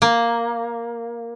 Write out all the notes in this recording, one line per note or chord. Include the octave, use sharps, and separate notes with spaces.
A#3